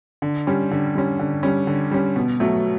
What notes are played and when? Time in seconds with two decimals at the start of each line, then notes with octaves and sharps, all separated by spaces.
0.22 D3
0.47 G3 C#4
0.71 D3
0.95 G3 C#4
1.19 D3
1.43 G3 C#4
1.67 D3
1.91 G3 C#4
2.16 B2
2.40 F#3 A3